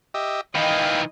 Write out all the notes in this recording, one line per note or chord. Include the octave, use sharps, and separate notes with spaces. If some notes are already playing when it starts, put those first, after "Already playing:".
G4 D#5 E5
D#3 E3 D#5 F5 G5 B5